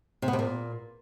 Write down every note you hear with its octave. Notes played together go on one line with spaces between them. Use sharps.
C3
B3
C3
A#2